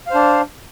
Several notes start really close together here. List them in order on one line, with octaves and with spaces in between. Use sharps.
F5 C5 D4